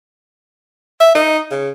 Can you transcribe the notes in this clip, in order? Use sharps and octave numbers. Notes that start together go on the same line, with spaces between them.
E5
D#4
C#3